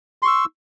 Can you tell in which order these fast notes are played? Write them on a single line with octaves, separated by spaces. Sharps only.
C6 C#6 E6